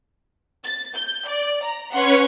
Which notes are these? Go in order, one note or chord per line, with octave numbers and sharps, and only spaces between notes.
A6
G6
D5
A#5
C#4 B4 C#5 F#5 C6 C#6